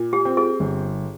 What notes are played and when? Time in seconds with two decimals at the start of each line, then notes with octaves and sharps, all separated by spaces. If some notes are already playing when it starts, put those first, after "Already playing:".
Already playing: A#2
0.13 G4
0.25 C4
0.37 G#4
0.60 G1